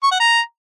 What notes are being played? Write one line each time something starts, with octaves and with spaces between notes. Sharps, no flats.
C#6
F#5
A#5